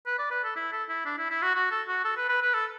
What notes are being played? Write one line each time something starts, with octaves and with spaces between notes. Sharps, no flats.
B4
D5
B4
A4
E4
A4
E4
D4
E4
E4
F#4
F#4
A4
F#4
A4
B4
B4
B4
A4